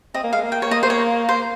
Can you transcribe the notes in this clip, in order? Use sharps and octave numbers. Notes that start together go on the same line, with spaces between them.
C4 D#5
A#3
G#3 F5
A#3
G5
C#5
D#5
C5
C#5
C5